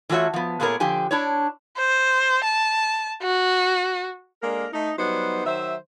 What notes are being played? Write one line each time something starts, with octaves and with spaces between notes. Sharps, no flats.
E3 A3 F4 F#4 C#5 E5
F3 B3
A#2 A3 B3 G#4 A#4 C#5
D3 F3 G4 G5 G#5
D4 E4 C#5
C5
A5
F#4
G#3 A#3 D4 A4 A#4
A3 D#4
F#3 G3 B3 D#4 C5
D#3 F#3 C5 E5